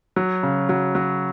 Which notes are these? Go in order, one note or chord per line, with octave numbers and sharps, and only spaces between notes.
F#3
C#3
F#3
F#3